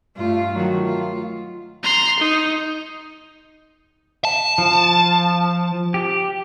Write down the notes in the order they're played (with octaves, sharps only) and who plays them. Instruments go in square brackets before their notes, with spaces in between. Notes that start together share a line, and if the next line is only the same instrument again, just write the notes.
[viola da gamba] G2 A3 F4
D#3 F#3 A3
F4
[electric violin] A#5 C6
D#4
[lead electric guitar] A5
[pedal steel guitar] F3
G4